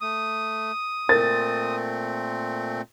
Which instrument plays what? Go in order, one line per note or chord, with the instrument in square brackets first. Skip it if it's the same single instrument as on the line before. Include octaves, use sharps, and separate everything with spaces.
[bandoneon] A3 [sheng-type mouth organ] D#6
[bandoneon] A#2 A3 C4 [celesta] A#4 [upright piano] A6